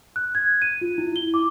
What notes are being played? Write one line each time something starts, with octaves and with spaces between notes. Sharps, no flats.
F#6
G#6
D#7
F4
E4
G7
D6